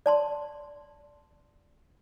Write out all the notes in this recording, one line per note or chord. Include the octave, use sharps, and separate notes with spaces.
D5 A5 C6